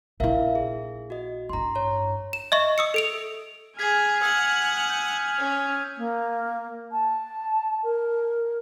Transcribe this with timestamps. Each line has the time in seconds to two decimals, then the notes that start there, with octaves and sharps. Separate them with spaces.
0.20 A#1 E4 A#4 E5 F5
0.55 G#4
1.10 F#4 D#5
1.49 A1 G2 A#5 C6
1.75 C#5 A#5
2.33 E7
2.52 D#5 E5 C#6
2.78 D#6 E6 C#7
2.94 A4 D7 F7
3.79 G#4 G#5 F6 G#6 B6
4.22 F#5 D#6 E6 G#6
4.90 G6
5.38 C#4
5.97 A#3
6.91 A5
7.83 A#4